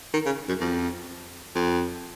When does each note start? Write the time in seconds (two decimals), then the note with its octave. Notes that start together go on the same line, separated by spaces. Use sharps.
0.14 D#3
0.26 C#3
0.49 F#2
0.60 F2
1.55 F2